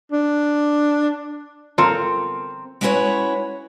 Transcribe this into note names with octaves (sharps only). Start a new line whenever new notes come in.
D4
C4 F4 A4 A#4
G#3 C#4 E4 F#4 B4 C#5